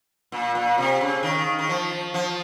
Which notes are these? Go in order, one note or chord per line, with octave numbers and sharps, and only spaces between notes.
A#2
A#2
C3
C#3
D#3
D#3
F3
F3